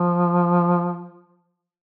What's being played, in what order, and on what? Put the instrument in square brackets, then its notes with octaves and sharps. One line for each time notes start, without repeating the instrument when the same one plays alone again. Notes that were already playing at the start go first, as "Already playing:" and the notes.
Already playing: [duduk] F3